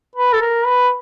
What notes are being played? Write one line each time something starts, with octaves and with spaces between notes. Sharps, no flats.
B4
A4
A#4
B4